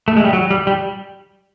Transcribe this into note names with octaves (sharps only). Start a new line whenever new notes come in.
A3
G#3
G3
F#3
G3
G3